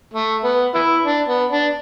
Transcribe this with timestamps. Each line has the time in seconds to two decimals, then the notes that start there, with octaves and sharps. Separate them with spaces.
0.14 A3
0.44 B3
0.74 B3 E4
1.05 D4
1.28 B3
1.51 D4